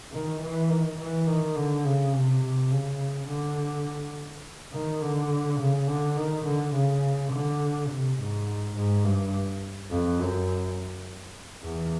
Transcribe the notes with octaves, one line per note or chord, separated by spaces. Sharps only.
D#3
E3
D#3
E3
D#3
D3
C#3
C3
C3
C#3
D3
D#3
D3
C#3
D3
D#3
D3
C#3
D3
C3
G#2
G#2
G2
F2
F#2
E2